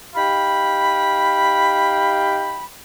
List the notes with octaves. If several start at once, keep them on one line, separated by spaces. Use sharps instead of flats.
D#4 G4 F5 G5 B5